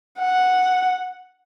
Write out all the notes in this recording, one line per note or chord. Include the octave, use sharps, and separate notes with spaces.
F#5